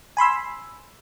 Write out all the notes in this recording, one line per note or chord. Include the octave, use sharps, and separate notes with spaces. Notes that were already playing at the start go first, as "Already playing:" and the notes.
G#5 B5 C6 E6